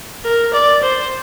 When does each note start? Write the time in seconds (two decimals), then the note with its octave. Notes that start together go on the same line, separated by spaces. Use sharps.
0.25 A#4
0.53 D5
0.83 C5